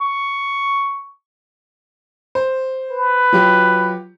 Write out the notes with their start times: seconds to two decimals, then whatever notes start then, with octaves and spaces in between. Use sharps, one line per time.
0.01 C#6
2.35 C5
2.91 B4
3.33 F#3 F4 G4